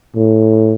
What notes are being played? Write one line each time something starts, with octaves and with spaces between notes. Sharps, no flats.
A2